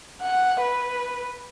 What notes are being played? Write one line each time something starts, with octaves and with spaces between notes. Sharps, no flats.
F#5
B4